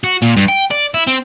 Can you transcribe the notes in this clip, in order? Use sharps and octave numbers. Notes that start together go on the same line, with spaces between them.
F#4
A#2
G2
G5
D5
E4
C4